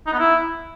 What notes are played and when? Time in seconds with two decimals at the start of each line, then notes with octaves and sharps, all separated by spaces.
0.07 D#4
0.13 B3
0.19 E4